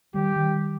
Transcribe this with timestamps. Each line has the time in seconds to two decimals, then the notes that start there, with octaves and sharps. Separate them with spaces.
0.14 D#3 G3 G4
0.36 D#3 G3